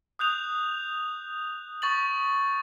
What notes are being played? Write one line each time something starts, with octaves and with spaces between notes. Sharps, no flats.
D#6 F#6 G6 F7
C#6 A6 F#7